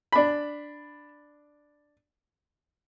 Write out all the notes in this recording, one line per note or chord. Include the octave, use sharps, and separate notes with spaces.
D4 B5